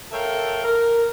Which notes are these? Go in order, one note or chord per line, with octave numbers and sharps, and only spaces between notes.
A4 A#4 C#5 E5 F5 G5
A#4